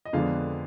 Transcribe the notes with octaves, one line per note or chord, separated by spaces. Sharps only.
D#5
F2 D3 G#3 B3 D4 F5